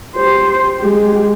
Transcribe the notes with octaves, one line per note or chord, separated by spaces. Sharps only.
G4 C5
G#3 G4